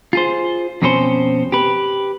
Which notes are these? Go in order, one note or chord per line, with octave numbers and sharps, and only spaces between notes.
F4 G#4 C5
F2 B2 C4 C#4 G4 C5
G4 B4